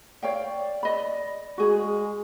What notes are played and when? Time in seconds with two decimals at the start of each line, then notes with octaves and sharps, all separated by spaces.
0.23 C#5 D5 F5 G5
0.83 D#5 B5
1.58 G#3 F#4 G#4